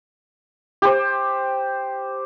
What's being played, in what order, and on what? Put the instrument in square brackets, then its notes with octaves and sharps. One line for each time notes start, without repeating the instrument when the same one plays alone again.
[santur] G4 C5